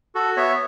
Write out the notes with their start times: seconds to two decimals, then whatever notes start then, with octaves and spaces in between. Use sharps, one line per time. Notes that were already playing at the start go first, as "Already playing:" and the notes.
0.15 F#4 A4
0.37 B3 C#5 E5